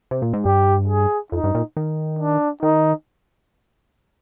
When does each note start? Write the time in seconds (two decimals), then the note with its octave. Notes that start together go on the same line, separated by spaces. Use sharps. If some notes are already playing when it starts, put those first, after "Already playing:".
0.11 C3
0.22 A#2
0.33 G#2
0.45 G2 G4
0.88 G#4
1.32 F2 D#4
1.44 G2
1.55 A#2
1.77 D#3
2.19 D4
2.63 D#3 D#4